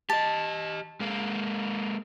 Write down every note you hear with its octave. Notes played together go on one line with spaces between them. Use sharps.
G4 D#5 A5
G#3 A#3 F5